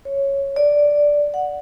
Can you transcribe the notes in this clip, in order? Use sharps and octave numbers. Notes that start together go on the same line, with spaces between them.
C#5
D5
F#5